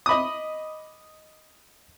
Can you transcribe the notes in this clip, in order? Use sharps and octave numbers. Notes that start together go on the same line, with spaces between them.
D#5 B5 D6 D#6